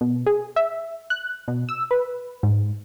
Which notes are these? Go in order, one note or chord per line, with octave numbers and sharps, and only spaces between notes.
B2
G#4
E5
F#6
B2
E6
B4
G#2